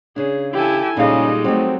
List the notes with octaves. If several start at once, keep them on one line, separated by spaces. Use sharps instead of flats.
C#3 D4 G#4
E4 G4 A4 G#5
A#2 C#3 G3 G#3 D#4 A4 D#5 F5
F#3 A3 C4